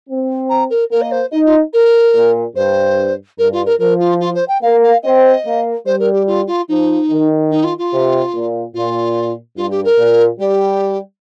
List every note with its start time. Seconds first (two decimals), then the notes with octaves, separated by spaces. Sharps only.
0.08 C4
0.49 A#5
0.70 A#4
0.91 A#3 A#4
1.01 D#5
1.11 C5
1.31 D#4 D#5
1.46 F4
1.73 A#4
2.14 A#2
2.55 G2 C5
3.38 G2 A#4
3.52 F4
3.66 A#4
3.79 F3 A#4
3.99 F4
4.20 F4
4.35 C5
4.48 G5
4.62 A#3 F5
4.83 F5
5.03 C4 D#5
5.44 A#3
5.86 G3 C5
5.99 A#4
6.13 G4
6.27 F4
6.47 F4
6.68 F3 D#4
7.10 D#3
7.51 D#4
7.64 F4
7.78 F4
7.92 C3
8.33 A#2
8.74 A#2 F4
9.57 G2 F4
9.71 G4
9.84 A#4
9.97 A#2
10.39 G3 G4